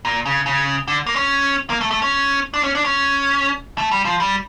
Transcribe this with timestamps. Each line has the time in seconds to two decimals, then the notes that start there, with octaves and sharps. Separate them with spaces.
0.05 A#2
0.26 C#3
0.46 C#3
0.88 D3
1.07 A#3
1.16 C#4
1.70 A#3
1.81 A3
1.91 A3
2.02 C#4
2.54 D4
2.64 C#4
2.75 D4
2.85 C#4
3.78 A3
3.91 G3
4.05 F3
4.20 G3